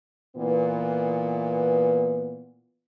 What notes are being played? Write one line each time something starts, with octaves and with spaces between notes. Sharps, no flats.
A#2 E3 B3